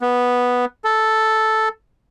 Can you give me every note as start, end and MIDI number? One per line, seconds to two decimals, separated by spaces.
0.01 0.65 59
0.84 1.69 69